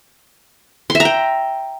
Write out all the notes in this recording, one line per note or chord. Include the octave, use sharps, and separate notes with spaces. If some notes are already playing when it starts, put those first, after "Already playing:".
C6
E5
A#5
G5